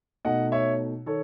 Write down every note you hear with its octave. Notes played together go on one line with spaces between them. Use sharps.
B2 A3 D#4 D#5 F#5
C#5 E5
D#3 A4 C#5